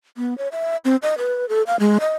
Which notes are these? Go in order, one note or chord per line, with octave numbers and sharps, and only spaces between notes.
B3
C#5
E5
C4
D#5
B4
A4
F5
G#3
D#5